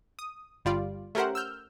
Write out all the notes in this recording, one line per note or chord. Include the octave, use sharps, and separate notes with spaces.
D#6
G1 G3 F4 D5
A3 C#4 G4 A#4 C5 F#5
E6 F6 G6